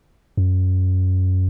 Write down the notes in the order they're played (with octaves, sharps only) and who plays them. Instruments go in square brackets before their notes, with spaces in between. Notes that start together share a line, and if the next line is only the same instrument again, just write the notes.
[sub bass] F#2